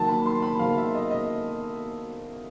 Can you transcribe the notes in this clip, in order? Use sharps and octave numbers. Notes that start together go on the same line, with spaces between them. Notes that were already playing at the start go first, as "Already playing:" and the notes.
Already playing: D#3 F#3 A#3 A5
B5
C6
B5
D#3 F#3 A#3 F5
E5
D#5
D#5